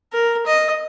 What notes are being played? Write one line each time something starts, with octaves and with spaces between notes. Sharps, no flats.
A#4
D#5